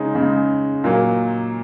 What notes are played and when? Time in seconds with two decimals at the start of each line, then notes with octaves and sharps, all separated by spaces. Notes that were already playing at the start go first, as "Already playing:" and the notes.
Already playing: C#3 G#3 C#4 D#4
0.15 C#3 G#3
0.84 A#2 F#3 A#3